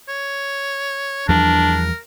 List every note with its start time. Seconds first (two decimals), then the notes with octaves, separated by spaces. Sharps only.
0.08 C#5
1.28 E2 F3 G3 D4 A#4